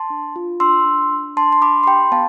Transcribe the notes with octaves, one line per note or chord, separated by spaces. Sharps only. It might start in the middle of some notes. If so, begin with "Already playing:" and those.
Already playing: A5 C6
D4
F4
D4 C6 E6
D4
D4
D4 A5 C6
C6
D4 B5 D6
C6
G4 G5 B5
B3 F5 A5